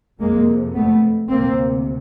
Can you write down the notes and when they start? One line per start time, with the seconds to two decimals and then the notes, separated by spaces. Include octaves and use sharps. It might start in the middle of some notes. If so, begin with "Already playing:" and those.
0.20 F2 C3 G#3 A#3
0.75 A3 B3
1.29 D2 C3 A#3 C4